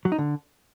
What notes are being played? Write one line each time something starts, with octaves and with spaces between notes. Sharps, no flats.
F#3
D#4
D3